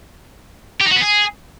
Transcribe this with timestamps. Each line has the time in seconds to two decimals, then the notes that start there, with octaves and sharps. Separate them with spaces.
0.80 G4
0.86 D#4
0.91 F#4
0.96 B3
1.01 G#4